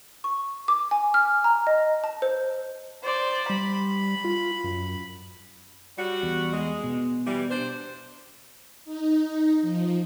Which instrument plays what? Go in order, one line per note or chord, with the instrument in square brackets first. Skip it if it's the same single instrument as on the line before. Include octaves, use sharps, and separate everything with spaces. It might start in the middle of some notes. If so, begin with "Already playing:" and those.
[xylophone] C#6
D6
G#5
F6
A#5
D#5
A5
C5
[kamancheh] C5 D5
[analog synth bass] G3 [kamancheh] B5
[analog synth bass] F4
F#2
[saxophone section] G3 F#4
[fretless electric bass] E2
[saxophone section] G#3
[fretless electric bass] B2
[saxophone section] E3 G3
D4 C5
[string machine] D#4
F3